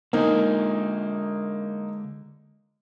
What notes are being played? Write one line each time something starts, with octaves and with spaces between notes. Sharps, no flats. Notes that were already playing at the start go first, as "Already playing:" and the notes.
D3 G#3 A#3 D#4 G#5